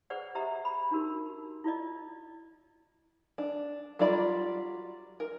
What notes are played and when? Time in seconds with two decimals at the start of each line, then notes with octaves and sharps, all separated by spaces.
0.10 G#4 B4 C5 D5 F#5
0.35 G4 C5 D#5 E5 A#5
0.65 B5
0.91 D4 D#4 F#4 G4 A#4
1.64 E4 F4 D5 D#5
3.38 D4
3.99 F#3 G3 F4 D5 B5
5.20 A#4